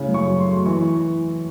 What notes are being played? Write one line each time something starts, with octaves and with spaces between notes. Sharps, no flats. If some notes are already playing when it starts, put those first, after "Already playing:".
Already playing: A2 C#3
F#2
C#6
F#3
C6
A3
E3 C#6